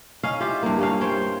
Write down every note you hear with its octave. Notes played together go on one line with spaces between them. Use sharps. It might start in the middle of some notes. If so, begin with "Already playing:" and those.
C#4 D#4 F5
E4 F4 G4
G2 A#3
G2 C#4 F5
C5 C#5 G5